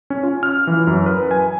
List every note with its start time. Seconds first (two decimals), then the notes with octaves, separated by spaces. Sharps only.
0.10 C#4
0.23 F4
0.43 F6
0.67 E3
0.87 F#2
1.06 B4
1.31 G#5